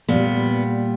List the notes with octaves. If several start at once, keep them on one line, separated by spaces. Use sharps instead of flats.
A#2 G3 B3